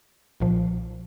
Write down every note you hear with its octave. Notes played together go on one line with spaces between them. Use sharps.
B1 A#2 F3